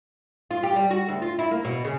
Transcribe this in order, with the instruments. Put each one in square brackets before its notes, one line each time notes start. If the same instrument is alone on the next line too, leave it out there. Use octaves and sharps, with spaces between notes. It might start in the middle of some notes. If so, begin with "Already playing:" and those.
[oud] F4
G4
G3
F#4
D2
F4
E4
A#3
B2
C#3